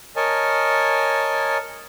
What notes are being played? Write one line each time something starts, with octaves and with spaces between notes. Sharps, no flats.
A#4 C#5 D#5 G#5 A5